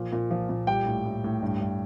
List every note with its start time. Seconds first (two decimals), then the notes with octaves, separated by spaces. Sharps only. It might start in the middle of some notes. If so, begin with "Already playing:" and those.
Already playing: A#2 F3
0.12 A#2
0.31 F3
0.49 A#2
0.67 G3 G5
0.86 A2
1.05 A2
1.24 A2
1.43 G2
1.61 G2